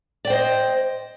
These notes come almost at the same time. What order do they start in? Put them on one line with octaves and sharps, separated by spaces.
D5 G5 C5 D#5